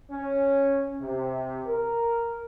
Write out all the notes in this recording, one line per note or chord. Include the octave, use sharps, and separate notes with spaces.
C#4
C3
A#4